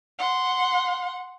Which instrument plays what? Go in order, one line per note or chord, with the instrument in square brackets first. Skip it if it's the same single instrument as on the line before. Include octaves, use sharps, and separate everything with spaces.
[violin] F#5 C6